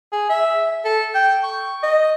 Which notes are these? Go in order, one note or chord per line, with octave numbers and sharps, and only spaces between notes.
G#4
E5
A4
G5
C#6
D#5